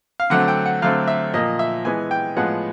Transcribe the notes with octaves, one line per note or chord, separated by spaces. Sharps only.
F5
D3 F#3 A3 C4 F#5
G5
F#5
D3 F#3 A3 C4 F5
E5
A#2 F3 A#3 D#5
E5
E3 G#3 B3 G#5
G5
A2 F3 G#3 B3 F#5